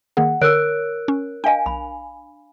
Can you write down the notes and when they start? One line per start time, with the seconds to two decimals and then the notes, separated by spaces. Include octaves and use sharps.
0.17 D#3 A#3 G#4 F#5
0.41 D3 A#4 C#5 E6 F#6 D7
1.08 C#4
1.44 D4 D#5 F5 G5 G#5
1.66 B1 B5